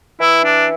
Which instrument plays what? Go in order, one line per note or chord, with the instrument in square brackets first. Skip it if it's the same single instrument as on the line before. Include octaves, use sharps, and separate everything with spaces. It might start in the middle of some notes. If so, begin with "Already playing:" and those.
[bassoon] E3 [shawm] E4
[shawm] D4